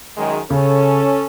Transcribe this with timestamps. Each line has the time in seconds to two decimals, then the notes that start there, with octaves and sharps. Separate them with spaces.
0.17 F#2 D#3 G#3
0.50 C#3 C#4 A4